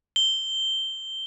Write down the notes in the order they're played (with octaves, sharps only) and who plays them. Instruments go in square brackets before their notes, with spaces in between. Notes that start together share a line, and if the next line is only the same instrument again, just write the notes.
[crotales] G7